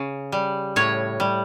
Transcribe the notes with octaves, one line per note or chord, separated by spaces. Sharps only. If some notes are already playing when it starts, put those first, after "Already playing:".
Already playing: C#3
G3
A2 C#5
G3